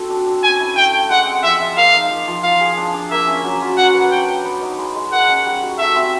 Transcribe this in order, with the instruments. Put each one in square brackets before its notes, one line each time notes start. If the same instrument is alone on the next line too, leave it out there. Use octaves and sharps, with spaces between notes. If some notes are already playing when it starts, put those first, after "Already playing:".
Already playing: [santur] C4 F#4 A4
D4
D4
[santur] C#4 [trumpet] G#5
[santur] E4
[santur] A3 [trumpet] G5
[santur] A3
[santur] G#3 [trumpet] F#5
[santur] C4
[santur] F3 [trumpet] E5
[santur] F4
[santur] A#3 [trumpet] F5
[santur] D#4
F3
F3
[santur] F4 [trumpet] F5
[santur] G#4
D4
D4
[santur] A#3 [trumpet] E5
[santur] C#4
F#3
F4
[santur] F#4 [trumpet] F#5
[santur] B4
[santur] D4 [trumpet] G5
[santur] D5
B3
D#4
G#3
G#3
[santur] A#3 [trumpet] F#5
[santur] C#4
G3
F#4
[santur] A3 [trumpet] E5
[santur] C4